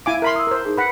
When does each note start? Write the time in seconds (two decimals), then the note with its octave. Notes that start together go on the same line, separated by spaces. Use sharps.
0.06 E4 F5 G#5 D6
0.22 A#4 E5 B5 C6
0.36 D#6 E6
0.47 A#4 C5
0.65 D#4 G#4
0.77 B4 F#5 B5 B6 C#7